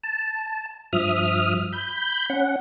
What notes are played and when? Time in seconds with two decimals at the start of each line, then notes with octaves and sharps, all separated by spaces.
0.03 A5
0.93 G2 F3 E5 D#6 F6
1.72 B5 G6
2.30 C#4 F#5